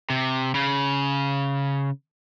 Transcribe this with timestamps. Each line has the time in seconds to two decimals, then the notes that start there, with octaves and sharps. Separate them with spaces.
0.10 C3
0.55 C#3